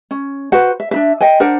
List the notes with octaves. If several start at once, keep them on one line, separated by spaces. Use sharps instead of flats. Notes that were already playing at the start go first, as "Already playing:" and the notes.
C#4
F#4 B4 C5 F#5
E5
D4 D#4 E5
D#5 G5 G#5
D4 A#4 C5 F#5